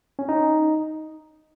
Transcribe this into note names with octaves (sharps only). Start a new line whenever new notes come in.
C#4
D#4